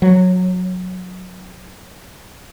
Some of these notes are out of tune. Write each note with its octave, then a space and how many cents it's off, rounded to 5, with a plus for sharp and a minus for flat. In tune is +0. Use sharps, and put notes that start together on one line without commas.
F#3 -15